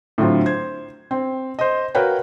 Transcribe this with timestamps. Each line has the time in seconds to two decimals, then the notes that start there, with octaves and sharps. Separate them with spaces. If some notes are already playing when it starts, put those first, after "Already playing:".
0.18 A2 D3 F#3 C4 F4
0.46 C5 G#6
1.11 C4
1.59 C5 D#5
1.95 F#4 A#4 B4 C#5 F5 G5